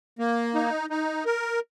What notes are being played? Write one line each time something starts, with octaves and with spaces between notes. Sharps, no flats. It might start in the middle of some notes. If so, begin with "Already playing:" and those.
A#3
D#4
D#4
A#4